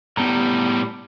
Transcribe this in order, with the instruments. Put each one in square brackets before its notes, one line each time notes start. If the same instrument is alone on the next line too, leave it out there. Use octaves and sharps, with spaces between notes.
[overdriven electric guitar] A2 G3 [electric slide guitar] B3 A#5